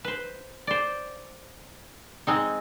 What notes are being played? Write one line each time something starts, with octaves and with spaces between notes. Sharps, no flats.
B4 C5
C5 D5
G#3 C4 D#4